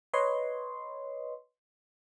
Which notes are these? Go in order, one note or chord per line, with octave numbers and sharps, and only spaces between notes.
B4 C#5 D#5 C6